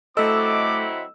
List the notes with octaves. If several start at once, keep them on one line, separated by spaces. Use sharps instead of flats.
F#3 A3 C4 E4 A4 D#5 D6 E6